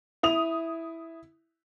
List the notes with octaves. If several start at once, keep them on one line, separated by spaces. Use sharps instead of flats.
E4 D#6 F7